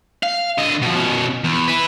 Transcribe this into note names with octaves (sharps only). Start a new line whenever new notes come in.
F5
D3 D#5
B2 F3
B2 C#4
E2
E4 B4